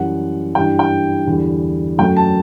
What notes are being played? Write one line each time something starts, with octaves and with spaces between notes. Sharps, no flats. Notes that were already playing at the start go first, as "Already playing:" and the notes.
Already playing: F#2 E3 G3 F#5
G2 E3 G3 G5
G5
E2 D3 G3
F#2 F#3 A3 G5
A5